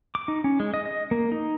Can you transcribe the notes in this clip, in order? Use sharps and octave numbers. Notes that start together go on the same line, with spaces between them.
D6
D#4
C#4
G#3
D#5
D#5
A#3
D#4